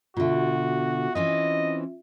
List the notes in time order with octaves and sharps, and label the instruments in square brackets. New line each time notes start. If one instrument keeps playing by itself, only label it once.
[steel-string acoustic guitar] B2 D3 [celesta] F4 E5 [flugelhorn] F#4
[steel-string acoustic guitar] E3 C4 C#4 [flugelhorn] D#5